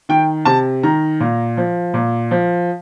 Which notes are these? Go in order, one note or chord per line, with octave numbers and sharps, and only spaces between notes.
D#3 G5
C3 A5
D#3 A#5
A#2
F3
A#2
F3